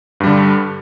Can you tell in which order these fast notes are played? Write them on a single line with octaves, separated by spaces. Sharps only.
G2 G3 D3